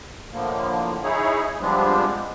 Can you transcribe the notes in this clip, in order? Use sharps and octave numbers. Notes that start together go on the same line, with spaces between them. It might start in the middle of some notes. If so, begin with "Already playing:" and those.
A2 D3 F3 A#3
D#4 E4 G#4 C#5
F3 G3 G#3 B3 C4 D4